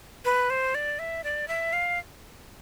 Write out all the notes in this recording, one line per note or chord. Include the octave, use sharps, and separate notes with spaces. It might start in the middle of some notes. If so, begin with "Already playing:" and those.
B4
C5
D5
E5
D5
E5
F5